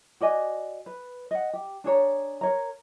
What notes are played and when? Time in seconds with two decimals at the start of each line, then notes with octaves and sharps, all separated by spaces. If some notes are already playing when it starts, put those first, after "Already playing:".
0.21 F#4 D5 D#5 G#5
0.86 B4
1.31 D#5 F#5
1.53 G4
1.84 D4 G#4 C#5 A#5
2.41 A#4 C#5 A#5